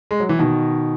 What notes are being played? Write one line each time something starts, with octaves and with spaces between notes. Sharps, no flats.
G#3
F#3
E3
B2 D#3